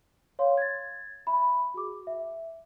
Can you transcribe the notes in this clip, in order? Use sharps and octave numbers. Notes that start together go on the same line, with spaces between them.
C#5 F5 C6
G#6 A6
E5 B5
F#4 G#4 D6
E5